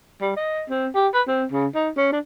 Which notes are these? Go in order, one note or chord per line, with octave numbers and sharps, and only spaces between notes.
G3
D#5
C4
G4
B4
C4
C#3
D#4
C#4
D4